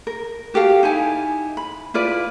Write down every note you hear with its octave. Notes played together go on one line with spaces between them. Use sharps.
A#4
F#4 G4 A4 F5
D#4 E4 G#5
B5
E4 F4 B4 D5